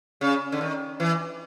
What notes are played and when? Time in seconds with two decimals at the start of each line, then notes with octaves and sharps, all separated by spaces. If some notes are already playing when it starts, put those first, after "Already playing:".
0.21 C#3
0.52 D3
0.61 D#3
1.00 E3